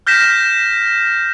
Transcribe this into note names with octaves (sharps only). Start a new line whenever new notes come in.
F6 G6 A#6 B6 E7